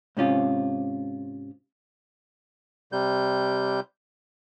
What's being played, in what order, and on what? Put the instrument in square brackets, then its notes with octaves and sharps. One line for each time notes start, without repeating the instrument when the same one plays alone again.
[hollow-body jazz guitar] G#2 C3 C#4 F4
[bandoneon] C3 G3 G6